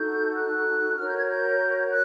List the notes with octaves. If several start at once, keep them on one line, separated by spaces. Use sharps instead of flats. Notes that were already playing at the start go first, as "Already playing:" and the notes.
Already playing: D#4 F#4 A4 G6
F#6
F#4 A#4 C#5 F6
G6
G#6
G6
F#6